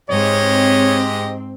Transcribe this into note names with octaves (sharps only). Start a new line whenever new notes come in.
G#2 G#3 C4 G4 C#5 D#5